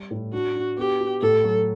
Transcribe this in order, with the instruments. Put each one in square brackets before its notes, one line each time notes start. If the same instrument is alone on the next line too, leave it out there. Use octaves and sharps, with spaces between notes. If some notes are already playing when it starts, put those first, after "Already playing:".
Already playing: [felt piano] G3
A2
[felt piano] D4 [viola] F#4
[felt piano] D4
[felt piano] B3 [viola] G4
[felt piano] F#4
[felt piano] A2 [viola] A4
[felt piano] F#3